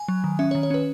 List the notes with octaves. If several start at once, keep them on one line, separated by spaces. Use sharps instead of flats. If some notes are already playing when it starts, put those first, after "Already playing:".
Already playing: G#5
F#3
D#3
C#4 E5
C#5
D#3
C#5
C#4 B4